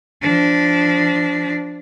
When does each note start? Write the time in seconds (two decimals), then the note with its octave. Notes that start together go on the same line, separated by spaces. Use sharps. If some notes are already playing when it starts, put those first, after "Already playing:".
0.22 F3 D4